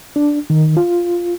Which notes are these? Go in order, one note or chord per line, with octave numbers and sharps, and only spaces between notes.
D4
D#3
F4